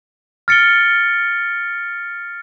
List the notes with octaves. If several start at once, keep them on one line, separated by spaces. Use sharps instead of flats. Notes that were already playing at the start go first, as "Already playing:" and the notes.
F6 A6 C#7 D7 G7